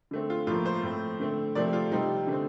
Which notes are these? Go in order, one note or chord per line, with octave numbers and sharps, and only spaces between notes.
D3 A3 C4
F4
A2 F3 A#3 F4
C5
A2 A3 C4
D3 A3 C4
C3 F3 A3 C4 D5
F4
C3 G3 C4 D#4
D3 A3 C4